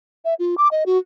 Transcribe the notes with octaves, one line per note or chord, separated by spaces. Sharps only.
E5
F4
D6
D#5
F#4